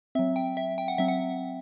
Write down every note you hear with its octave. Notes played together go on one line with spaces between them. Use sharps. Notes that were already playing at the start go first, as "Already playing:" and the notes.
F#3 C4 E5
G5
E5
G5
F#5
F#3 C4 E5
F#5